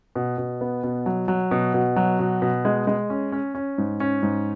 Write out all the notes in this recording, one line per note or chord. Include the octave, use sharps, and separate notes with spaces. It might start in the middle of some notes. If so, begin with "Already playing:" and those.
B2
B2
B3
B2
F#3
F#3
B2
B2
F#3
B2
B2
G#3
G#3
C#4
C#4
C#4
G#2
C#4
G#2